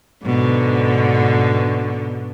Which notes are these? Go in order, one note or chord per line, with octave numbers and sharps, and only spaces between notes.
G#2 B2 D3